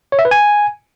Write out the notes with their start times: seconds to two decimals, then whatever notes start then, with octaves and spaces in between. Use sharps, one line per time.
0.12 C#5
0.19 E5
0.25 B4
0.31 G#5